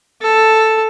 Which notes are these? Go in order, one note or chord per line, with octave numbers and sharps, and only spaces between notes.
A4